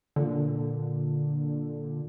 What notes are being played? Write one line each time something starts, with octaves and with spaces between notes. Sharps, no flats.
A#2 D3